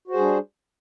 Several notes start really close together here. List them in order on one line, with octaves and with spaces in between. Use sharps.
F#4 C5 G#4 G3 D4